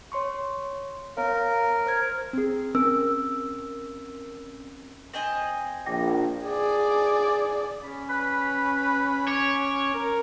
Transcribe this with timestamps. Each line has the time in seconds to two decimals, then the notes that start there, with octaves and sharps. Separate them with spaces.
0.12 C#5 C6 C#6
1.17 B3 A#4 C#5 F5
1.86 C5 F6 G#6
2.33 C4 G#4
2.75 C4 C#4 A#4 E6
5.13 C4 D#5 G#5
5.86 A#1 G5 D6 A#6
6.46 G#4 D5
7.83 C#4 B5
8.10 B4 B5
9.28 C#5 D6
9.94 A#4